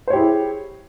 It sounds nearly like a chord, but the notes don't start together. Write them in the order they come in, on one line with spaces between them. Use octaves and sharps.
C5 C#5 G4 E4 G#4